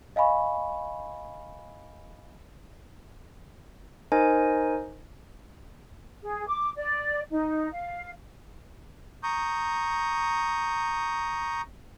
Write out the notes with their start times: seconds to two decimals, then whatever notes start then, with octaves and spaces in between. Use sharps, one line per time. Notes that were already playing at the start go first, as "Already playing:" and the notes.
0.16 D#5 F5 G#5 B5 C#6
4.12 D#4 A#4 C5 D#5 G#5
6.23 G#4
6.46 D6
6.76 D5
7.30 D#4
7.71 F5
9.23 A#5 C#6 D#6 G6